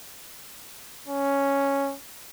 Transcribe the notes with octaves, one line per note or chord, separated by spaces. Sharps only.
C#4